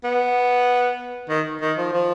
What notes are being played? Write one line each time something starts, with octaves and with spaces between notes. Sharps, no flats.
B3
D#3
D#3
F3
F3